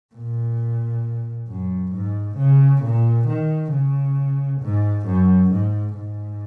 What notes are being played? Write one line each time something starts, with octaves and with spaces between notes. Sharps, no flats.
A#2
F#2
G#2
C#3
A#2
D#3
C#3
G#2
F#2
G#2
G#2